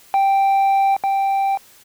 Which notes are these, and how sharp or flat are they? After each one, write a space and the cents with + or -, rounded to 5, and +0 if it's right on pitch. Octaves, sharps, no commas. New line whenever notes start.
G5 +0
G5 +0